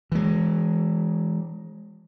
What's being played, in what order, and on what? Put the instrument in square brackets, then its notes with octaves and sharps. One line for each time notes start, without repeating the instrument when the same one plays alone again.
[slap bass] E3 G#3